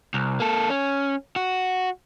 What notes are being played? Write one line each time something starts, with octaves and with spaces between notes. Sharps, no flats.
C2
A#3 A4
C#4
F#4